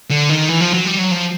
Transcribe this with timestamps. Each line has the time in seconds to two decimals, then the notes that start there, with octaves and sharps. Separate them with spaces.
0.10 D3
0.29 D#3
0.48 E3
0.60 F3
0.73 F#3
0.86 G3
0.98 F#3
1.11 F3